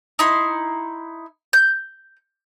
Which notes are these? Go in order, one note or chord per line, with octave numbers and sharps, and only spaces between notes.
D#4 E4 C6
G6